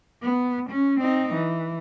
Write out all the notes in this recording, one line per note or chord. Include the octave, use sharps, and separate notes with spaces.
B3
C#4
C4 D#4
E3